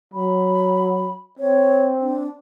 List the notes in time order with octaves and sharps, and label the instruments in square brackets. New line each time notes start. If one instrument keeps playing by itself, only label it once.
[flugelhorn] F#3 [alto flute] B5
[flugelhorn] C4 [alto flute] C#5
[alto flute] D4